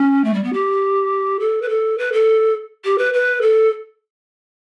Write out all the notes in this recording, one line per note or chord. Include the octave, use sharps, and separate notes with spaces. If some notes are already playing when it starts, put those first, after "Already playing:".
Already playing: C#4
A3
G3
B3
G4
A4
B4
A4
B4
A4
G4
B4
B4
A4